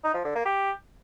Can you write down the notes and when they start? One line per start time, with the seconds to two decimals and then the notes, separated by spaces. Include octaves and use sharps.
0.04 D#4
0.14 F3
0.24 D3
0.35 A#3
0.45 G4